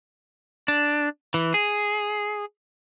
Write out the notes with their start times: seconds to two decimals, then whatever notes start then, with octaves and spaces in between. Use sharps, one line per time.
0.68 D4
1.34 E3
1.54 G#4